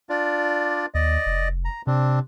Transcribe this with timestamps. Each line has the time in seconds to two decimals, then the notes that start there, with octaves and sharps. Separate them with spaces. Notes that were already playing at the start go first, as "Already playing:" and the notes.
0.09 D4 F4 D5
0.94 D#2 D5 D#5
1.26 F1
1.65 A#5
1.87 C3 C4 D4